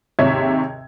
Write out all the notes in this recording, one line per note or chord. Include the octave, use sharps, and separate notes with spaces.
D#2 G#2 C3 C#5 E5 G#6